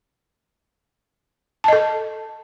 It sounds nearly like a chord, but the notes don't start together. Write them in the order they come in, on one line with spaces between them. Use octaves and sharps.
A5 D#5 A4